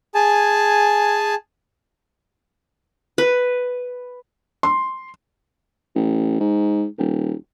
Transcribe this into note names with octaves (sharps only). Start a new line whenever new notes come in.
G#4 G#5 A5
B4
C6
A1
G#2
D#1